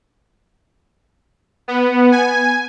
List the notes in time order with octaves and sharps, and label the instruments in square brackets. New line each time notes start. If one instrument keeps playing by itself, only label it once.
[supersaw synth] B3
G#5